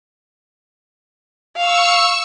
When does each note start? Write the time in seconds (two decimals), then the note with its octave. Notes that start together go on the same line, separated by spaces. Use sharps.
1.56 F5 C#6 E6 C#7